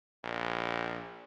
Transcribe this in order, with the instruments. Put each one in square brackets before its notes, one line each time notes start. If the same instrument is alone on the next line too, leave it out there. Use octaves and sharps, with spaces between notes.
[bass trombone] A#1